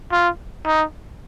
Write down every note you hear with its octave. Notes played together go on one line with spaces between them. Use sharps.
F4
D#4